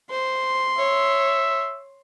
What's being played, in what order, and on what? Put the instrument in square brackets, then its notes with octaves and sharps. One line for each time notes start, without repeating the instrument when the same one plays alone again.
[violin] C5 [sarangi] C6
[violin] C#5 [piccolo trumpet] E5